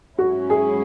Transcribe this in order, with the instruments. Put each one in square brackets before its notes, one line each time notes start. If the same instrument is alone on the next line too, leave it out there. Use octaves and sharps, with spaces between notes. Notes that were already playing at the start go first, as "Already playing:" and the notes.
[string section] G#2 F#3 C#4 E4 [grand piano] F#4
[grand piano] G#4